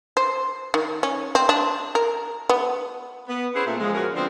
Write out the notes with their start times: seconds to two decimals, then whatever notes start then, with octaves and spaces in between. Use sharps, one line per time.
0.17 C5
0.74 D#3
1.03 C#4
1.35 C4
1.49 D4
1.95 A#4
2.49 B3
3.28 B3
3.54 C#4 E4 G#4 B4 C5 F#5
3.66 A#2 A3
3.80 C#3 E3 F3 G#3
3.94 F3 C#4 F#4 A#4
4.14 D3 F3 G#3 B3 C4 D4